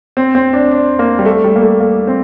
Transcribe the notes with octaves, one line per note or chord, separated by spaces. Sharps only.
C4
C4
D4
D4
A#3
G3
A3
G3
A#3
A3
A#3
C4